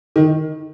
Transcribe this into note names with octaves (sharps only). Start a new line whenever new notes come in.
D#3